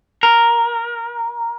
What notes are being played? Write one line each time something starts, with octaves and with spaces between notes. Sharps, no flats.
A#4